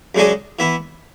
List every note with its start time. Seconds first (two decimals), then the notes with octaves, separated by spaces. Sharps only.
0.15 F#2 C#3 G#3 D4 G#4
0.59 E3 B3 E4